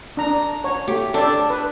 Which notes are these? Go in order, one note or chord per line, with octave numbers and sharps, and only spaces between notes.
D4 A#5
C#5
A3 G4
D4 A4 D5
B4